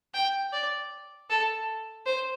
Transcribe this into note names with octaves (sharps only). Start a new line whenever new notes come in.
G5
D5
A4
C5